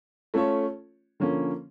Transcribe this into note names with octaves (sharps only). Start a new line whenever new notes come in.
A3 C#4 F4 A4 C#5
D3 F3 A#3 C#4